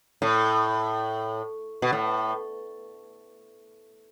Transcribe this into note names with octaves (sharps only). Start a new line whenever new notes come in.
A2
B2
A2